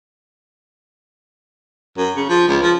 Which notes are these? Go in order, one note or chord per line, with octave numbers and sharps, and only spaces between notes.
F#2
C#3
F3
C#2
F3